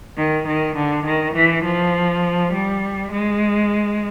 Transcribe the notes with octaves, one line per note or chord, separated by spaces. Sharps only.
D#3
D#3
D3
D#3
E3
F3
G3
G#3